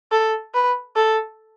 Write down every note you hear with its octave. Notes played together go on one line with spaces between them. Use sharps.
A4
B4
A4